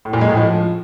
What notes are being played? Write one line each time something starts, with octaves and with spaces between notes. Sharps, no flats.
A2
A#2
G#3
A2
F3